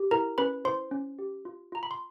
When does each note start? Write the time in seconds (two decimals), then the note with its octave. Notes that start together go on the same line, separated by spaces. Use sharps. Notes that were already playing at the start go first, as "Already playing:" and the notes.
Already playing: G4
0.11 E4 A#4 A#5
0.38 C#4 B4 B5
0.64 E4 C5 C6
0.91 C#4
1.19 G4
1.45 F4
1.72 F4 A#5
1.83 B5
1.91 C6